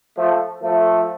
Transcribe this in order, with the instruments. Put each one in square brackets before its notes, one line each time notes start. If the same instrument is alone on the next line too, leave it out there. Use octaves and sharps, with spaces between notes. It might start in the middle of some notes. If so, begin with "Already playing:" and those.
[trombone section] F3 A3
F3 A3